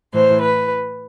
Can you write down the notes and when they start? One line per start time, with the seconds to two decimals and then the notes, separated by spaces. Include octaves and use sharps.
0.13 A2 E3 C5
0.41 B4